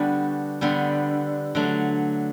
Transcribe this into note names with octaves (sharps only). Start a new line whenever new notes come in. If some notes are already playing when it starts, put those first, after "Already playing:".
Already playing: D3 G3 B3 D4 F#4
D3 G3 B3
D3 F#3 A3